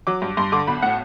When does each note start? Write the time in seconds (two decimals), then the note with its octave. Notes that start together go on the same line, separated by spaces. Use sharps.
0.07 F#3 D6
0.22 G2
0.37 G2 C6
0.52 D3 D6
0.67 B1 B5
0.82 A2 F#5